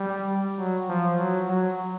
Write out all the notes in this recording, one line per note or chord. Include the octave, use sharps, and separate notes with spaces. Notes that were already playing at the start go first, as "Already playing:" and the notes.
Already playing: G3
F#3
F3
F#3
F#3